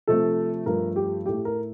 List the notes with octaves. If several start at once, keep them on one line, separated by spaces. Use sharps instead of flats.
C3 F3 A3 A4
G2 F3 A3 A#4
G4
A2 A3 G4
A#4